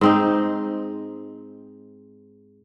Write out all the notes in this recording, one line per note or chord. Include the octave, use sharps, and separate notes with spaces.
G#2 C4 D#4